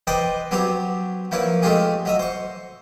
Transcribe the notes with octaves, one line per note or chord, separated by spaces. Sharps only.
B4 C5 D5 D#5 G5
F#3 B3 C4 G4 C#5
F3 A#3 E4 B4 C#5
G#3 A3 C4 F4 G4 G#4
F#3 D#5 E5
C5 C#6